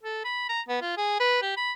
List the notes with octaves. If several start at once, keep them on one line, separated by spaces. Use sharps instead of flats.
A4
B5
A#5
B3
F4
G#4
B4
G4
B5